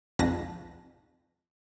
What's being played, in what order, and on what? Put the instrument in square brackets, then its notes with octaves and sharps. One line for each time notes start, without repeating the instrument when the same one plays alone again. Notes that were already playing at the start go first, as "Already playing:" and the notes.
[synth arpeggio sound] B1 F2 G#2 B4 A5 A#6